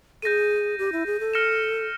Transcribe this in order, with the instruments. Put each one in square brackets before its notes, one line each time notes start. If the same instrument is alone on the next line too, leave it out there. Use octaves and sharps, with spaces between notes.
[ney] A4 [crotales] D#7
[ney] G#4 [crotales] G6 A#6
[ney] G4
E4
G#4
A4
[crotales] F6 A#6 C#7 E7